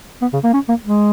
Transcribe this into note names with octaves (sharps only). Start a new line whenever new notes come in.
B3
C#3
A#3
C#4
A#3
G#3